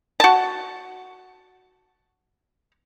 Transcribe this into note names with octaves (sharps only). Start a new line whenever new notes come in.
F#4 A5